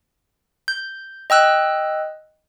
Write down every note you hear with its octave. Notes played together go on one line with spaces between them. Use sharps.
G6
D#5 G5 E6 F#6